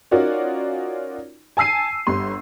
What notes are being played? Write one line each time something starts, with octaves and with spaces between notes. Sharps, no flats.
C#4 D#4 F4 F#4 A#4 D5
G#5 A5 E6 C7 D#7
G1 G2 C6